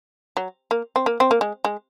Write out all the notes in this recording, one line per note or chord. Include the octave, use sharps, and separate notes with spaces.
F#3
A#3
C4
A#3
C4
A#3
G#3
G#3